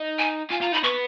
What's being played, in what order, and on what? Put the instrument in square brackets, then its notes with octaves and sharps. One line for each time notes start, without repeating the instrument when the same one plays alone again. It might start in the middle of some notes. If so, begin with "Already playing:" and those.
Already playing: [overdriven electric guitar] D#4
[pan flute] G#5
[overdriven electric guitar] F4 [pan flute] G#5
[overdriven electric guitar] F4 [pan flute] A#5
[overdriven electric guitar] D#4 [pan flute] B5
[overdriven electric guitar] B3 [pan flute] C#6